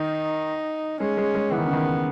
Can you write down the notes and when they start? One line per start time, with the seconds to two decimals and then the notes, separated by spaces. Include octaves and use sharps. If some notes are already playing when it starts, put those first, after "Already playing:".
Already playing: D#3 D#4
1.00 G#3 C#4
1.17 G#3
1.35 G#3
1.51 E3 B3
1.58 D#3
1.66 C#3
1.73 D#3